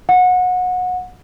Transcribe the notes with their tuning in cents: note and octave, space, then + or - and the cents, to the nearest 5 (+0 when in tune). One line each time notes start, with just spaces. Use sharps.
F#5 -25